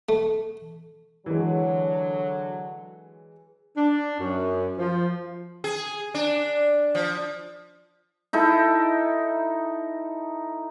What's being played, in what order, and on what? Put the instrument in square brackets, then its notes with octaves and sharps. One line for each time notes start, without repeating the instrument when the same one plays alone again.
[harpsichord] A3
[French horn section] D3 F#3 [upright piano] E3 G#3
[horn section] D4
F#2
F3
[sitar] G#4
D4
F3
[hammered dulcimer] D#4 E4 A4